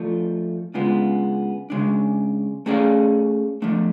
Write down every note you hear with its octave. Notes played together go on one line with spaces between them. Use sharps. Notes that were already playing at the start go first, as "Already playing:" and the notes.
Already playing: F3 A3 D4
C#3 G#3 B3 D4 F4
C#3 G#3 D4
A3 C#4 G#4 D5 F5
F3 A3 D4